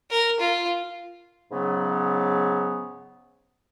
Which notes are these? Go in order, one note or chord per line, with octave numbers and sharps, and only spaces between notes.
A#4
F4
G#2 C#3 F#3 B3